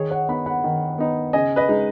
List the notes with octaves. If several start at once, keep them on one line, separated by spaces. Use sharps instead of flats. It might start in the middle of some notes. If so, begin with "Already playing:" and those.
Already playing: D#3 G#4 C#5
C#5 F#5
B3 D#4 F#5 B5
F#5 B5
D#3
B3 D#4
C#3 D#5 G#5
B4 D#5
G#3 D#4